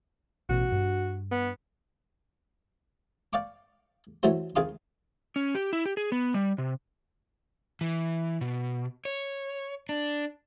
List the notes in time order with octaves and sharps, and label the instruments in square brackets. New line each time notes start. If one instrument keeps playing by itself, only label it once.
[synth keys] A1 B2 [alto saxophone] F#4
[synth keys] G2
[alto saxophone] B3
[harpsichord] D5 F5 G5 C#6 D6
E3 F#3 A3 F#4 C5
F2 D#3 G#4 F5 C6 D#6
[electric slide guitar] C#4
G4
E4
G4
G#4
B3
G3
C3
E3
B2
C#5
D4